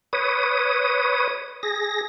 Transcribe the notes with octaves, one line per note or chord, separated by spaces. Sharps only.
B4 C#5 D#6
G#4 A#6